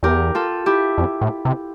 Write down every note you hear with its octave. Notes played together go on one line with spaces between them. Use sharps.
E2 G4 A#4
F4 A4
E4 G4
F2
A2
C3